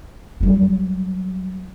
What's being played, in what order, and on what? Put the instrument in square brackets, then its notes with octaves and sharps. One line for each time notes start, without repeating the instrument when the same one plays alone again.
[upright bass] F#3 G3